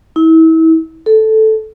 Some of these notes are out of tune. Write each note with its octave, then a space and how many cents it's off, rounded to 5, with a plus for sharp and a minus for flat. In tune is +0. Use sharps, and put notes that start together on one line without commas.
E4 -35
A4 -5